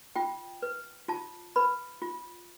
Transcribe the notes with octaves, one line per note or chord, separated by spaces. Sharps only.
F4 G5
B4
F4 A5
B4 B5
F4